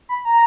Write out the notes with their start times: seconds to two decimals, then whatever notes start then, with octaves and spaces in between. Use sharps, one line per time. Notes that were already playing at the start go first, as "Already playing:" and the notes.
0.09 B5
0.25 A#5